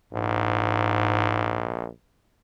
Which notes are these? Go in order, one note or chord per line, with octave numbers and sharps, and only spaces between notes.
A#1 G#2